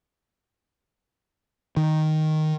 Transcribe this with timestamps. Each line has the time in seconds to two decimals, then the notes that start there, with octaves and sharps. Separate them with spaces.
1.77 D#3